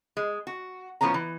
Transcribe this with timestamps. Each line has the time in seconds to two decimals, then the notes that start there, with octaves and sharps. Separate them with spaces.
0.17 G#3
0.47 F#4
1.01 A2 F3 B3 C#4 A#5
1.14 E3